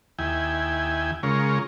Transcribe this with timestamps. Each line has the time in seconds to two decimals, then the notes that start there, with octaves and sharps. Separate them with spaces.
0.19 D#2 E4 G5 G#5
1.23 C#3 G#3 F4 A#4 C#5